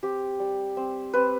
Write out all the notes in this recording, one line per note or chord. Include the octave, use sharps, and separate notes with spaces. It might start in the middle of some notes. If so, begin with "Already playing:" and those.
C4 G4
G3
C4
C4 B4